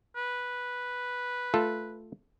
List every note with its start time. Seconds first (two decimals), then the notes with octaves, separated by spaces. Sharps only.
0.16 B4
1.54 A3 F4 A4